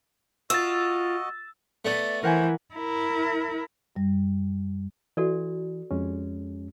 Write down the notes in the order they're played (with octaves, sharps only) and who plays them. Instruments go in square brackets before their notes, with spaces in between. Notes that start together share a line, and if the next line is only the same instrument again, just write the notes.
[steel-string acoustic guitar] F4 [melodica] F#4 D#5 [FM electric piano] E6 A6
[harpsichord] A3 B3 [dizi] D5
[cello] E3 [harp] A#4 F#5 G#5 [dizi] C5
[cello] E4 A#4
[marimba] F#2 G3
[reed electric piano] E3 [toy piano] F#4 A4 D5
[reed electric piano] F2 G#3 C#4